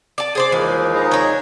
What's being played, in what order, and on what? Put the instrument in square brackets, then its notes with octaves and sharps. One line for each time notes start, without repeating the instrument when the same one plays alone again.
[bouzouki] D5 A5
G#4 C5 D5
[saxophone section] D#2 F3 G#3 [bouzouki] E3
[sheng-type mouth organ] D#4 G#4 A#5
[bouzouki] D4 C#5